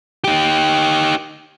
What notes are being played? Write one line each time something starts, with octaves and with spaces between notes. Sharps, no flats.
D#4 G4